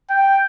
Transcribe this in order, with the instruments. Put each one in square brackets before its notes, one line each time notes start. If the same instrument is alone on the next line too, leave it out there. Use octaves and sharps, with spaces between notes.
[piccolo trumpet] G5